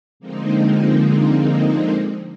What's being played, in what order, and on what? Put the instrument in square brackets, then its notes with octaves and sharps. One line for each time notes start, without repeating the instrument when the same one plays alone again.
[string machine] D3 F3 G#3 A#3 C4 D#4